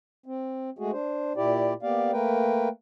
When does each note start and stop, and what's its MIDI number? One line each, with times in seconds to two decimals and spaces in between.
0.26 0.70 60
0.79 0.91 56
0.79 0.91 57
0.79 0.91 66
0.79 0.91 68
0.92 1.33 62
0.92 1.33 72
1.36 1.74 46
1.36 1.74 64
1.36 1.74 67
1.36 1.74 74
1.83 2.11 58
1.83 2.11 59
1.83 2.11 67
1.83 2.11 74
1.83 2.11 77
2.12 2.69 57
2.12 2.69 58
2.12 2.69 70
2.12 2.69 71
2.12 2.69 79